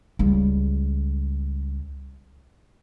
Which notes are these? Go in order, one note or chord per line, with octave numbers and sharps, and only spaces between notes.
C#2 G3